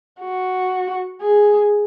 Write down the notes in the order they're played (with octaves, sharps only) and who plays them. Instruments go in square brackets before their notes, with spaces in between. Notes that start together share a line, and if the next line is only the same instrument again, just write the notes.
[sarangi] F#4
G#4